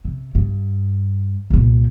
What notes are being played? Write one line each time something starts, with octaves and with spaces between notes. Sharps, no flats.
C3
G2
C2 A#2